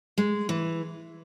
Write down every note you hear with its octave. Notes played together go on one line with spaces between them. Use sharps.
G#3
E3